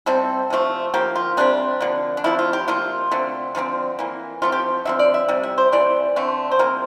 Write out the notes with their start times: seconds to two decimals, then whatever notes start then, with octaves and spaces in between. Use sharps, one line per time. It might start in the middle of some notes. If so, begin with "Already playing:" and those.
0.06 C3 G3 C4 A4
0.50 C3 F3 A3
0.94 F3 A#3 G4
1.16 F4
1.37 C3 G3 C4 D4
1.81 D3 F3 A#3
2.17 D4
2.24 F3 A3 C4 E4
2.39 F4
2.53 G4
2.68 C3 F3 A#3 F4
3.11 D3 A3 C4
3.55 D3 F3 A3 C4
3.99 E3 A#3
4.42 F3 A3 C4 F4
4.52 G4
4.85 D3 F3 C4 E5
4.99 D5
5.14 E5
5.29 C3 G3
5.43 E5
5.58 C5
5.72 C3 E3 A3 D5
6.16 D3 A3 C4
6.51 C5
6.59 C3 G3 A#3 A#4